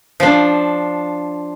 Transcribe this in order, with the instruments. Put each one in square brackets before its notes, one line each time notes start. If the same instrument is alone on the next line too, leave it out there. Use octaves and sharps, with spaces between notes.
[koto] F3 D4